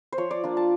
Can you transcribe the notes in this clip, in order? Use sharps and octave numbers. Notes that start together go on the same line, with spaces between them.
C5
F3 C#5
D5
A#3 D4 F4
A5